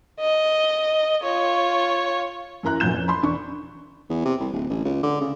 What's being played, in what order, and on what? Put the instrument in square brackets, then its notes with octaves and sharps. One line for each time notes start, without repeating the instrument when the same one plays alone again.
[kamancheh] D#5
F4 C#5
[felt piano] F#2 E3 A#4 A#5 F#6
F1 F#2 A#2 F#3 G6 E7
F2 C#4
B5 C6
E1 D4 C#6
[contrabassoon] E2
C3
C2
D1
A1
C#2
D3
C#3